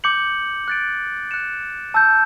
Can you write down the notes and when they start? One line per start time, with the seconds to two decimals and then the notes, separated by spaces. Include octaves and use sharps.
0.04 D6 G6 C#7 F#7
0.68 F#6 A6 D7
1.31 F#6 C#7 E7
1.94 A5 E6 G6